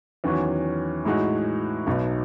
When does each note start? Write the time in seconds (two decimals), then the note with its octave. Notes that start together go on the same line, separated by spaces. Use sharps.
0.24 E2 D#3 F#3 C#4 F#4
1.05 A2 G#3 D#4 F#4
1.86 B1 B2 F#3 B3 D#4